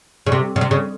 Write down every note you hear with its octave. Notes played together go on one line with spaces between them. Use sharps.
C#3
C3
C#3
C3
C#3